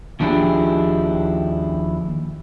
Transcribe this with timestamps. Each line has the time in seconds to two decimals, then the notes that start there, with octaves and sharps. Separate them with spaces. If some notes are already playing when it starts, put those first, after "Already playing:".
0.20 D#2 F3 D4 E4 G4 G#4